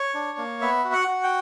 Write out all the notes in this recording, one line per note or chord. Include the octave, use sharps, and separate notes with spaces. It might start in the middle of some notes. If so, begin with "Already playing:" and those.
Already playing: C#5
D4
A#3
B3 E5
F#4
F#5
F#4
G5